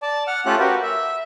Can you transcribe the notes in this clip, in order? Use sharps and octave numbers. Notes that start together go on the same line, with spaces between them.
D5 A5
F#5 F6
A3 C#4 F4 G4 A4 F#6
F#4 G4 A#4 B4
E5